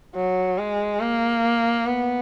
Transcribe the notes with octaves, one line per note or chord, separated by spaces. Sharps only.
F#3
G#3
A#3
B3